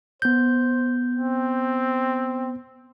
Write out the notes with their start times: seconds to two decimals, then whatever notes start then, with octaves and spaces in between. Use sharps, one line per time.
0.22 B3 C5 G6
1.15 C4